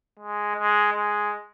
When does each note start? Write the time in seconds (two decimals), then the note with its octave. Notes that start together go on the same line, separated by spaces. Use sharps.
0.19 G#3
0.56 G#3
0.93 G#3